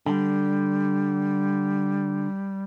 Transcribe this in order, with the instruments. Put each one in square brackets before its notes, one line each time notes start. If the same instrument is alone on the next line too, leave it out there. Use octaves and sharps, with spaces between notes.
[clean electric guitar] D3 [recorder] G3